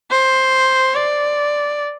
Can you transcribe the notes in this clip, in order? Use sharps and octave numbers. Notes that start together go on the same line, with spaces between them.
C5
D5